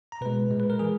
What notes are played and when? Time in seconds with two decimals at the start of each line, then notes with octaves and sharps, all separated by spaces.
0.12 A#5
0.21 B2 G#3 B4
0.50 A#2 G#3
0.60 B4
0.70 A#4
0.79 E3 G#3 G#4